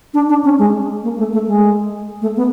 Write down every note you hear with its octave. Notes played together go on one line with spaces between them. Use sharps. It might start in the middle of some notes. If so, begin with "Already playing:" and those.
D4
D4
C#4
G#3
A#3
A3
A3
G#3
A3
B3